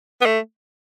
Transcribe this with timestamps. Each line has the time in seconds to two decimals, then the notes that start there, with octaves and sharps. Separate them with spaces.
0.21 B3
0.26 A3